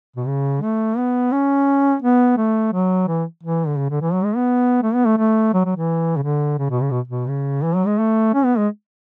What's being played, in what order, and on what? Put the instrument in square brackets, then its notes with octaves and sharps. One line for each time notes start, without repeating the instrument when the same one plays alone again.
[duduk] B2
C#3
A3
B3
C#4
B3
A3
F#3
E3
E3
D3
C#3
D3
E3
F#3
G#3
B3
A3
B3
A3
A3
F#3
F#3
E3
C#3
D3
C#3
B2
C#3
B2
B2
C#3
E3
F#3
G#3
A3
C#4
B3
G#3